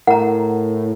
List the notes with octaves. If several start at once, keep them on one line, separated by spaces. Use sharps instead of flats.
A2 A#4 F#5 A#5